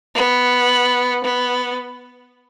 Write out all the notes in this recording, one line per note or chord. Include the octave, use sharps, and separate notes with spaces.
B3
B3